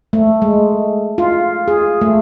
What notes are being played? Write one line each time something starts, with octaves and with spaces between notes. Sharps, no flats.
A3
G#3
F4
G#4
A3